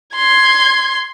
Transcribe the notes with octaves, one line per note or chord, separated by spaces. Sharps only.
C6 G#6